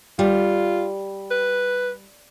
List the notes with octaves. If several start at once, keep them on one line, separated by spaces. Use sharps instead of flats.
G3 F4
B4